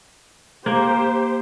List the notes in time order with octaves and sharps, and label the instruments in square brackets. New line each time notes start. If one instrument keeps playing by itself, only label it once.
[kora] A#3 [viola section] G4 C5